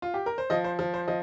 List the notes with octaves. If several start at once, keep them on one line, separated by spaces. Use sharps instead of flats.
F4
G4
A#4
C5
F3 D#5
C5
F3
C5
F3 D#5